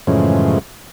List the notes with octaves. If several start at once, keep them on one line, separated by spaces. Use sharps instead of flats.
F#2 A2 C#3 E3 F3 G#3